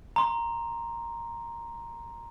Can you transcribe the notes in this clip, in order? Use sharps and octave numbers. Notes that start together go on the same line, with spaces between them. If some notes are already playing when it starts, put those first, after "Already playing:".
A#5 C6